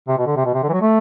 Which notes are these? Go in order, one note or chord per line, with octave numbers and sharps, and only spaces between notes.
C3
B2
D3
C3
B2
C3
D3
E3
F#3
A3